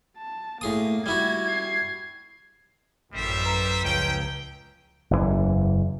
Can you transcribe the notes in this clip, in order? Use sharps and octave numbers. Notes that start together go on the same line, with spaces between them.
A5
A2 A#3 G#4 D#6
G3 E4 F#4 G#6
G#6 C7
A1 F#2 G3 C5 E5
B4 A#5
C#2 F3 C#4 G5
F#1 E2 A2 E3